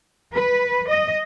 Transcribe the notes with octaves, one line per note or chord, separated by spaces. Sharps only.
B4
D#5